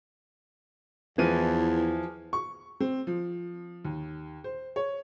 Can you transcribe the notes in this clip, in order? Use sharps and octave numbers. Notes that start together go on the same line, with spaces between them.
E2 E3 F3 D#7
C#6
C4
F3
D#2
C5
C#5